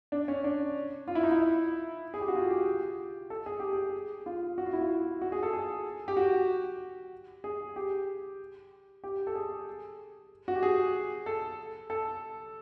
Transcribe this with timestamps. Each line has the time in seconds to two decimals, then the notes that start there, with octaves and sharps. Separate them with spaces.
0.12 D4
0.28 C#4
0.44 D4
1.08 F4
1.15 E4
1.23 D#4
1.31 E4
2.14 G#4
2.21 G4
2.28 F#4
2.35 F4
2.50 G4
3.30 A4
3.46 G#4
3.60 G4
3.73 G#4
4.26 F4
4.58 F#4
4.66 F4
4.73 E4
4.81 F4
5.22 F#4
5.32 G#4
5.43 A4
5.53 G#4
6.08 G4
6.17 F#4
7.44 G#4
7.76 G4
9.04 G4
9.27 A4
9.35 G#4
10.48 F#4
10.55 G4
10.63 G#4
11.26 A4
11.90 A4